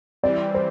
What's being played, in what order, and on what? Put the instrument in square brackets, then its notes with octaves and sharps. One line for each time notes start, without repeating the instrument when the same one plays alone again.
[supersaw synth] E3 G3 C4 [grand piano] D5
[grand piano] C5